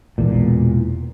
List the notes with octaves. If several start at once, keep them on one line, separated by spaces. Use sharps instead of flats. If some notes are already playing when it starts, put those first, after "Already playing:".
E1 E2 A#2